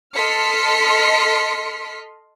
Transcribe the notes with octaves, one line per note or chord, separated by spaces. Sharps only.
A4 D#5 C6 F6 B6 C#7